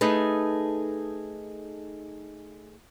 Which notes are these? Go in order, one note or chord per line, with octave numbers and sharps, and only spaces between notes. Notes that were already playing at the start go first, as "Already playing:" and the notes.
A3 D#4 G#4 A4 B4